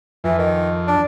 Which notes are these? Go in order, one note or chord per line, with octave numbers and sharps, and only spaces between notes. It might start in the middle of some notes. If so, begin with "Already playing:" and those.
F2 E3
D#3
D4